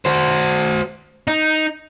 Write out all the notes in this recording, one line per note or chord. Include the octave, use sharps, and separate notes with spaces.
F#4 C5
D#4